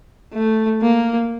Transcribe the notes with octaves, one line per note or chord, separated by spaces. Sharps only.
A3
A#3